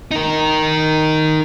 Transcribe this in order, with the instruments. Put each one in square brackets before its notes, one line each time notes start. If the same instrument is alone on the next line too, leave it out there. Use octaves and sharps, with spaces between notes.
[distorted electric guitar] D#4 A#4